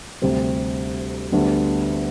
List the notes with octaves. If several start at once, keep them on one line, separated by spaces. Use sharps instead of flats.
D2 C3 G3 C4
D2 D3 G3 B3